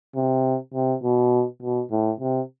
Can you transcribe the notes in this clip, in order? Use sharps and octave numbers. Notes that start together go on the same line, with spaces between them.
C3
C3
B2
B2
A2
C3